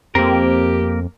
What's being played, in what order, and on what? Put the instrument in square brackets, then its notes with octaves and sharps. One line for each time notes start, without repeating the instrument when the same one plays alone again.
[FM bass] F2 [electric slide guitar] A#3 A#4 [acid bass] C4 [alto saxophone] G4